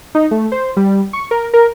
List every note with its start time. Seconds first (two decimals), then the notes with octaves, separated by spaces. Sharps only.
0.15 D#4
0.31 A3
0.52 C5
0.77 G3
1.13 C#6
1.31 A#4
1.54 A#4